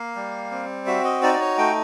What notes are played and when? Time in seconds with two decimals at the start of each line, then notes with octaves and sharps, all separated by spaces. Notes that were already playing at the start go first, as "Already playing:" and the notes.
Already playing: A#3 F5
0.16 G3
0.51 C4
0.87 F#4 E5
1.05 D#5
1.22 D#4 D5
1.33 D5
1.41 C#5
1.58 A3 G5